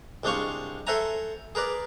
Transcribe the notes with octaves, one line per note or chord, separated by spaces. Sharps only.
C2 G#3 D4 C5 F5 C#6
A4 C5 E5 F#5 G#5 A#5
G#4 A#4 B4 D5